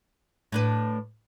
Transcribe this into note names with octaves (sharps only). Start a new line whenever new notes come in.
A2 D4 B4